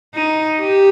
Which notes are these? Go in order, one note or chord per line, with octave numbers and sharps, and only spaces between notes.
D#4
G4